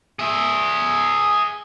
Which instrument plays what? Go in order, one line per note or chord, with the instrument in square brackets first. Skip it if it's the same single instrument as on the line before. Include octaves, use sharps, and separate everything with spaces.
[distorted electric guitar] G#4 E5